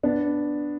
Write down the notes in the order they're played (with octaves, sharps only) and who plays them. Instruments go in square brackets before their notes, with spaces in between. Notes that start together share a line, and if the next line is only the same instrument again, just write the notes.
[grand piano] B3 D4